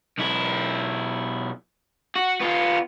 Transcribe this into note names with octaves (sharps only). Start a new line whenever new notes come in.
B1 E4
F#4
B3 F4